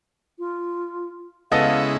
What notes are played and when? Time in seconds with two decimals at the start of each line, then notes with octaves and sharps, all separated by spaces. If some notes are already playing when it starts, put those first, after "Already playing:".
0.39 F4
1.52 C#3 G#3 B3 E4 A4 D#5 F5